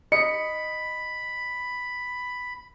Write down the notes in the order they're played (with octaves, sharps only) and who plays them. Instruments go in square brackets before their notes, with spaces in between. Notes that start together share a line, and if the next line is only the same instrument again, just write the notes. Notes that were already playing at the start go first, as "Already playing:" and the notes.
[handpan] D#5 [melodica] B5 [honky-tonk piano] C#7